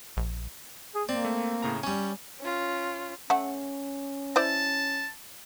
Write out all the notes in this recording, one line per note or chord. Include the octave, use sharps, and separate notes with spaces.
A#1
G#4
A#3 C4 D5
A3
A2 C#3 A#5
G3 C#4 G#5
C#4 F4
A3 C#4 F#5
E4 C5 D5 A5